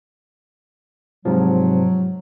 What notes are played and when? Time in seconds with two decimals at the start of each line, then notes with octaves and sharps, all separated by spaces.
1.25 G#2 C3 F3 F#3